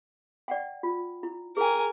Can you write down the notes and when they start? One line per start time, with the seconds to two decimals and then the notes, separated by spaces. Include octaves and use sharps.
0.48 D5 F#5 G5
0.83 F4
1.23 E4
1.57 G#4 A#4 G5 G#5